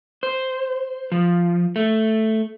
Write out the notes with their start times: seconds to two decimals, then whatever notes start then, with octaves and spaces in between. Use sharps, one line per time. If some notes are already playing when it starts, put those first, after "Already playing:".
0.23 C5
1.12 F3
1.76 A3